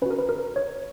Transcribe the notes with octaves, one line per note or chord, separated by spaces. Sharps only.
C#4 F#4 A#4 B4
B4
A#4
C#5